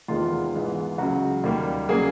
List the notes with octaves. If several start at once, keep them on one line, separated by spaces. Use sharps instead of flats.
E2 C3 D#3 G#3 B3 F4
G#2 E3 G#3 B3
C#2 C#3 F#3 F#4
D#2 D#3 G3 A#3
C#3 F#3 A#3 G#4